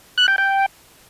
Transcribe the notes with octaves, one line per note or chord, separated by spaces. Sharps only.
F#6
G5
G5